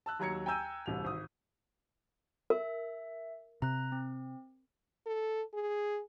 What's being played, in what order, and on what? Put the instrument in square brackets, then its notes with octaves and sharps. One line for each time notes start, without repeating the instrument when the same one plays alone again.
[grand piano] A5 E6 F#6
D#2 F#3 A#5 G#6 C#7
G5 G#5 A#5 E6 G6 D#7
E1 C2 F7
G#1 D#6
[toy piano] A#4 [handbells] E5
[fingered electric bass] C3 [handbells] A#5 F#6
[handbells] C4
[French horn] A4
G#4